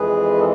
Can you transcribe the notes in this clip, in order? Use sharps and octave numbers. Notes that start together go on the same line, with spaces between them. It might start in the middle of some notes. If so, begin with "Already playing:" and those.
Already playing: F2 E3 G#3 G#4 B4
A4